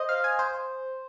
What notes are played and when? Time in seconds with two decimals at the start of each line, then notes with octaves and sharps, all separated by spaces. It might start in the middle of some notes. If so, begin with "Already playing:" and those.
Already playing: C5 D#5
0.09 F5
0.24 G#5
0.39 C5